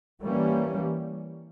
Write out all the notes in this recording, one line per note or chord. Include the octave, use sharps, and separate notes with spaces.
E3 G3 A#3 C#4